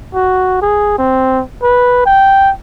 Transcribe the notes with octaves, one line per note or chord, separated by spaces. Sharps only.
F#4
G#4
C4
B4
G5